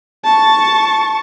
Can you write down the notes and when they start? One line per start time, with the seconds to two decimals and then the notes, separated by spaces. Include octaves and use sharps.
0.25 A5 C#6